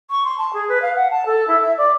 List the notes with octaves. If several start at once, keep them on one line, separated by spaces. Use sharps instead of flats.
C#6
C6
A5
G#4
B4
F5
F#5
A5
A4
E4
E5
D5